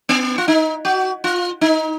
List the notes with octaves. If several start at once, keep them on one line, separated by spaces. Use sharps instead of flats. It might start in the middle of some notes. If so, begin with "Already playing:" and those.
B3
F4
D#4
F#4
F4
D#4